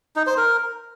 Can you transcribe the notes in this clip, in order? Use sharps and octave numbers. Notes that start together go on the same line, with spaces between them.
D#4
C5
A#4